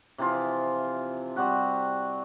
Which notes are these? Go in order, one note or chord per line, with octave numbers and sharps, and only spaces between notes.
C3 E3 F3 F4
G3 C4 F#4 F#5